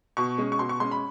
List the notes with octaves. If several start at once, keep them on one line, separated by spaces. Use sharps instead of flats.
B2 C#6
G#3 C#4
C#6
B2 C6
C#6
G#3 C#4 C6
B5